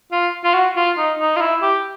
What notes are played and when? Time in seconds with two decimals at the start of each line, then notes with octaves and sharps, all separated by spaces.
0.12 F4
0.44 F4
0.54 F#4
0.76 F4
0.97 D#4
1.19 D#4
1.36 F4
1.40 E4
1.62 G4